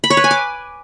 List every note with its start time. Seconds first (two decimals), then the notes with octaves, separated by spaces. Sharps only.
0.04 B5
0.10 C#5
0.17 B4
0.24 G#5
0.31 D6